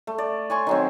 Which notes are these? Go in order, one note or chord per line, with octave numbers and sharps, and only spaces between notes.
A3
D5
C#5 G#5 C6 C#6
D#3 F#3 C4